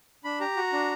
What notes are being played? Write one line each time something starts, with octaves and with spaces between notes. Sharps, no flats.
D4 B5
G4 A#5
F#4
D4